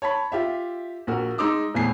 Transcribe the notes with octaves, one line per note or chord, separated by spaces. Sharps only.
C#5 A5 B5
F4 G4 E5
A#1 F#4 A#4
G#3 D#4 C6 D6 E6
D#1 E2 A2 B3 G#5 C7